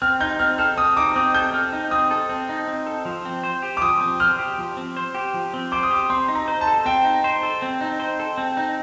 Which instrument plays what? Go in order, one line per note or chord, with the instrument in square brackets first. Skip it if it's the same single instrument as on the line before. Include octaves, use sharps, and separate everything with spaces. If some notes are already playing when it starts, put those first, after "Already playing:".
[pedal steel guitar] C4 [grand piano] F6
[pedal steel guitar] D#4 [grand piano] G6
[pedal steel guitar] C4 [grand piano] F6
[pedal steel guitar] A4 [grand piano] F6
[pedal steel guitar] C4 [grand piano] D#6
[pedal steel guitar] D#4 [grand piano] D6
[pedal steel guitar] C4 [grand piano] D#6
[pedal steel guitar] A4 [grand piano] G6
[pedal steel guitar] C4 [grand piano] F6
[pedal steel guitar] D#4
[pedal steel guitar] C4 [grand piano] D#6
[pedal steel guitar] A4
C4
D#4
C4
A4
F3
C4
C5
G4
[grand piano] D6
[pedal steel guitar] F3 [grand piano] D#6
[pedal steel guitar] C4
[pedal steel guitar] C5 [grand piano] F6
[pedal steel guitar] G4
F3
C4
C5
G4
F3
C4
[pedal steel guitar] C5 [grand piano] D6
[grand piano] D#6
[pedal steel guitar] G4 [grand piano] D6
[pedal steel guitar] C4 [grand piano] C6
[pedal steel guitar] D#4
[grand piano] A#5
[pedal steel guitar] C5
[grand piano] A5
[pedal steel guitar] A4
[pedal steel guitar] C4 [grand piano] G5
[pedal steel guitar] D#4
C5
A4
C4
D#4
C5
A4
C4
D#4